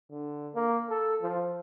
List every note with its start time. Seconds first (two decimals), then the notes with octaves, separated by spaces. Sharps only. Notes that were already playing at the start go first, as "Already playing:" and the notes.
0.11 D3
0.55 A#3
0.90 A4
1.22 F3